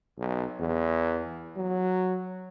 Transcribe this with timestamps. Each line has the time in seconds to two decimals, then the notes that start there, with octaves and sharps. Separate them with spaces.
0.18 B1
0.60 E2
1.57 F#3